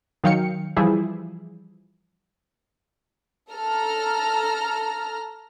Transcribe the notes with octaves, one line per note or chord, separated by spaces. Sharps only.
D#3 F#3 F5 G5 C#7
E3 F3 G3 E4 G#4
A4 A#5 F6